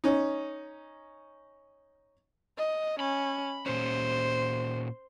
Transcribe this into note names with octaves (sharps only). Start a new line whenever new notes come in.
C#4 D#4
D#5
C#4 B5
A#2 C#4 C5